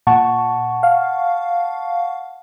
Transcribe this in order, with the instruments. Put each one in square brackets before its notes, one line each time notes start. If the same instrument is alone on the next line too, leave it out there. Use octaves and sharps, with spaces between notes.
[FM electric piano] A#2 [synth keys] F#5 A5 C#6
[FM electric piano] F5